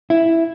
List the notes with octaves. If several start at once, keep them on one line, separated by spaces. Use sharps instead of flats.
E4